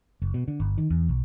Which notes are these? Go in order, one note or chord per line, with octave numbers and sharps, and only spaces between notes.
F#1
B2
D3
G1
D#3
E2
B1